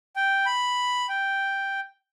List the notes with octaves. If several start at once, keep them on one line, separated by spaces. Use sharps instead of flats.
G5
B5
G5